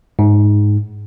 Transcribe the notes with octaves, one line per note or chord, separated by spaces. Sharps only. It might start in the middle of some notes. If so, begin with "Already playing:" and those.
G#2